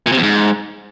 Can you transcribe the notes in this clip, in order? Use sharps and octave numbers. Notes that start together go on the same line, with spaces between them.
A#2
C3
E2
G#2